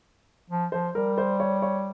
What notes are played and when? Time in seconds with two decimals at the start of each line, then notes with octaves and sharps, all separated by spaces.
0.50 F3
0.72 F3 C5
0.95 G3 A#4
1.18 C5
1.40 C#5
1.62 C#5